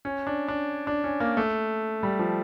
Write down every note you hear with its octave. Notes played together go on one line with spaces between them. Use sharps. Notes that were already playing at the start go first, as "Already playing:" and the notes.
C#4
D4
D4
D4
C#4
A#3
A3
G3
F3